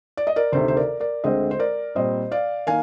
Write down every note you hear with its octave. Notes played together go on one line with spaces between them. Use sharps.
D5
D#5
A#4 D5
D2 C3 D#3 C5
C5
A#4 D5
A#4 D5
D2 D3 G#3 C4 C5 D#5
C5
A#4 D5
A#2 G3 C4 C5 D#5
D5 F5
D#3 A#3 F5 G#5